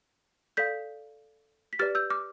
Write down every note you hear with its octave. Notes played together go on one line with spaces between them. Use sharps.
A4 D5 F5 G6 B6
B6
G4 B4 D5 F6 A6
E6 G6
D6 F6